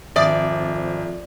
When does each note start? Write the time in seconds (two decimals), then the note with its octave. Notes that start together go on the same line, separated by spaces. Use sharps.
0.16 G#1 F2 D5 E5 D#6